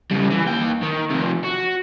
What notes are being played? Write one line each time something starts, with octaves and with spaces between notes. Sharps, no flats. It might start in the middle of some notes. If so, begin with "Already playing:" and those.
C#3 G3
E3
D#2 G5
D#3
C3 F3
F#4